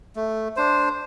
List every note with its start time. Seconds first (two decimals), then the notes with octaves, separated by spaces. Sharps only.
0.16 A3
0.56 D4 C5